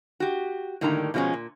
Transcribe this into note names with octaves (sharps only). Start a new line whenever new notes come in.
F#4 G4
A2 D3 D#3 G3 A#3 A#5
B2 F3 G#3 A3 C#4
A#2